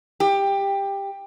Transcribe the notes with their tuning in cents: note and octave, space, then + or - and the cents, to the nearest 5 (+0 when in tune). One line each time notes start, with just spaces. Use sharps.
G4 +15